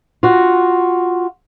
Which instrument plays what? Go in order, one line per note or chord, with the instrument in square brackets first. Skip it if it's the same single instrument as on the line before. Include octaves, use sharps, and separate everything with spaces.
[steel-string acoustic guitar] F4 F#4